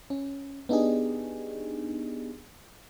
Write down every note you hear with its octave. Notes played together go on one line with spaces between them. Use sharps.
C#4
B3 D4 D#4 G4 G#4